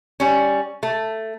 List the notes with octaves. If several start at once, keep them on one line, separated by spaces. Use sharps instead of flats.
G3 C#4
A3